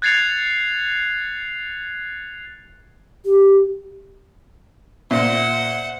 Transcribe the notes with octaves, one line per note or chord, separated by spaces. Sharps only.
F#6 G#6 A6 C7 C#7 F7
G4
A#2 C5 E5 F#5